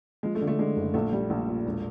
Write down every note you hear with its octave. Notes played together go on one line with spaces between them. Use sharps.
F3 G#3
A3
D3
A3
D3 G#3
F#1
A#1 A3
G3
A#1
A#2
E1